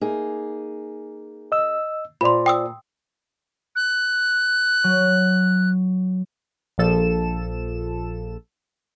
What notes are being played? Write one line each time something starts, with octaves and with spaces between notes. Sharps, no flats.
A#3 D#4 G#4
D#5 E6
A#2 F4 C5 D5 B5 C6
G5 D#6 E6
F#6
F#3
A#1 F3 A4 E7